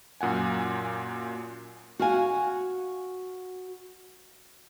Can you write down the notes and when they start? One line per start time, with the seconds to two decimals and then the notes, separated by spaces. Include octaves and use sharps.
0.21 F#2 A#2 F#5 G#5
1.99 F#4 F5 G#5